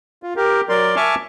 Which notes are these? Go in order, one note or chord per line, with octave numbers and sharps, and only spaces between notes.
F4
G4 A#4
F#3 A#4 D5 C6
E5 G#5 A5 C#6 D6 F6